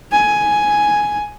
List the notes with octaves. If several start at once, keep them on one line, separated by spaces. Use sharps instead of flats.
G#5